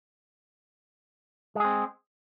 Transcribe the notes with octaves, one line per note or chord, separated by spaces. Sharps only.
G#3 C4 G#4